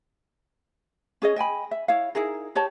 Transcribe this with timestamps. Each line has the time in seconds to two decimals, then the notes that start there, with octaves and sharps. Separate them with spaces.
1.22 C#4 G#4 C#5 D#5
1.36 D#5 G5 G#5 B5
1.71 E5
1.88 E4 C#5 F5
2.15 D#4 E4 G#4 A#4
2.55 G4 C#5 D#5 A5